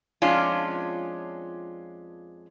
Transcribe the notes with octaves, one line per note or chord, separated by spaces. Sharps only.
F2 G#3 C#4 D4 F4